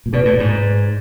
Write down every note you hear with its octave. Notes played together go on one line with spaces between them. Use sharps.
A#2
B2 G#4 B4 D5
A2
G#2